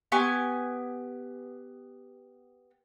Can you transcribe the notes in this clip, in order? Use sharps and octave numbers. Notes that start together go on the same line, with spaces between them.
B3 G4 G#5 C#6